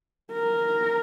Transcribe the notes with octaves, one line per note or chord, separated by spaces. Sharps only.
A#4